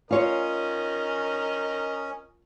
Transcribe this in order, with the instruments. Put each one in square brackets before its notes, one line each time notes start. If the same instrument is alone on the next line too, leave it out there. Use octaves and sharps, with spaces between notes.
[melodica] C#4 [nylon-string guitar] F4 C#5 [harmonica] A#4 D#5